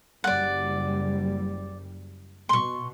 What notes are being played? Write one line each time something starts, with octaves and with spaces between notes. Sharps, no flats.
F#1 G3 D5 F#5
B2 C6 C#6